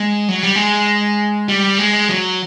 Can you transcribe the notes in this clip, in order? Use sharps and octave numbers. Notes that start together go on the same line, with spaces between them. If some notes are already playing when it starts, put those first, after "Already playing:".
Already playing: G#3
F#3
G3
G#3
G3
G#3
F#3